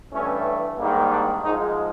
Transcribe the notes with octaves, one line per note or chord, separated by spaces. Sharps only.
G2 E3 A3 C#4
G#2 D#3 G3 A#3
D4
G#2 F3 G#3 D#4